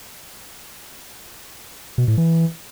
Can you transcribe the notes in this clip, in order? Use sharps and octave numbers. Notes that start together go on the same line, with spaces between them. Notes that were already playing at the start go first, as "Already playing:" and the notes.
B2
A2
E3